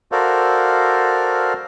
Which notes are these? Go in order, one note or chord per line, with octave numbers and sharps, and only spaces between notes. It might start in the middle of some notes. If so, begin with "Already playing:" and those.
F#4 A4 A#4 C5 D5 F5